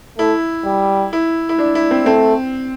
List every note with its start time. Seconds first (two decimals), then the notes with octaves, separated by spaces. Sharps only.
0.18 A3 E4
0.65 G3
1.13 E4
1.49 E4
1.58 D4
1.75 E4
1.91 C4
2.05 A3 C4